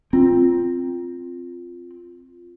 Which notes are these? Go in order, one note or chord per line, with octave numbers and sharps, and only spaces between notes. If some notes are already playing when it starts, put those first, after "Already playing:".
C4 F4